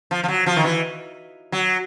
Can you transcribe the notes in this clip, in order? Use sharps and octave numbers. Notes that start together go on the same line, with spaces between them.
F3
F3
F#3
F3
D#3
E3
F#3